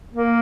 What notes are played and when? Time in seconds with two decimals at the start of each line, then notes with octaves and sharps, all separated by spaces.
0.13 A#3